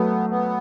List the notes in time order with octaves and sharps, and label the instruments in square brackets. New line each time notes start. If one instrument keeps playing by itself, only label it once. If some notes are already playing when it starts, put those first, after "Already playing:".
Already playing: [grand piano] F#3 A3 [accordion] B3
[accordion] B3